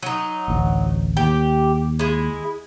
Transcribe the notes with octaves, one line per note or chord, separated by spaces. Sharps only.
F#3 D#4
A1 D2
D#2 G4
G#3 E4